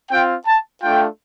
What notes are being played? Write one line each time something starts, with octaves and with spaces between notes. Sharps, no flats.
C4 F4 G5
A5
A3 D4 F4 G5